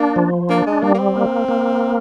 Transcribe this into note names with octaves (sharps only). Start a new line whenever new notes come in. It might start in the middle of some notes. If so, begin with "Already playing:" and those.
Already playing: A#3 D4
F3
A#3 D4
G#3
G3 A#3
A#3
C4
A#3
A#3